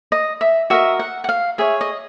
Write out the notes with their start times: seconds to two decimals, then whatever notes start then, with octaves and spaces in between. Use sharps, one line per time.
0.12 D#5
0.41 E5
0.70 F#4 A#4 D#5 E5
0.99 F#5
1.24 F#5
1.29 F5
1.58 G#4 C#5 E5
1.81 D#5